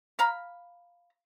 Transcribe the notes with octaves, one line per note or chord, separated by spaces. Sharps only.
F5 A#5 B5